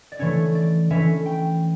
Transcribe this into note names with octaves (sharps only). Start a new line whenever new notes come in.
D5
E3 A3 C#4 C#5
D5
E3 A3 C#4 E5
G5